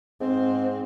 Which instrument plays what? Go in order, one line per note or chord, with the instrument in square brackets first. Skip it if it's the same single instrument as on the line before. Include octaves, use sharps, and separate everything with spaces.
[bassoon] G#2 [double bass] C4